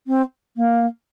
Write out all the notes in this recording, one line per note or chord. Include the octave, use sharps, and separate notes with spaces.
C4
A#3